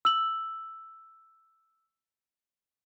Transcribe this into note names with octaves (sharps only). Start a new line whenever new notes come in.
E6 F#7